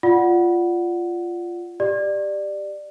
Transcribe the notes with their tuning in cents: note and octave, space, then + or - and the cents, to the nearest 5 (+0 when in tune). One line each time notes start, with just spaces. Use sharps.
F4 -10 D5 +0 F#5 +0
G4 +5 D5 +15